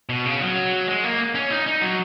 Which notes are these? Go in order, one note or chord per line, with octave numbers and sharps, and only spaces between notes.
B2
C#3
F#3
G#3
A#3
C#4
D#4
D#4
F#3